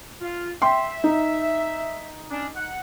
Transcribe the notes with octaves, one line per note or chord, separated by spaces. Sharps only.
F4
E5 G5 C6
D#4
C#4 D4
F#5